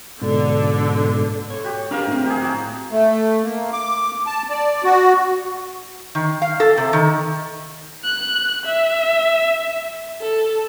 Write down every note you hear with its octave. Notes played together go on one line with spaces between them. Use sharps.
G#2 B2 D3
A4 C#5
F#4 G4
D4 G4 G#4 A#4 F5
A2 C4
G4 G#4
F#4 A5
A3
A#3
D6
A5
D5
F#4
D#3
F5
A4
C3
D#3
F#6
E5
A4